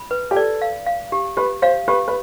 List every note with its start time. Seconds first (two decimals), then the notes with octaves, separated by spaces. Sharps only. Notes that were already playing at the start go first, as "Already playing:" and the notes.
Already playing: B5
0.11 B4
0.31 G4
0.36 A4 D5
0.62 F5
0.87 F5
1.12 G4
1.37 G4 B4
1.62 C5 F5
1.88 G4 B4
2.08 B4